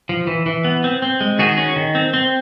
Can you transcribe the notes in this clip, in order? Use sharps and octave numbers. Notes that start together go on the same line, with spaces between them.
F3
E3
E3
B3
C4
C4
G#3
D#3 F#4 G#4
C#4
D#3
C4
C4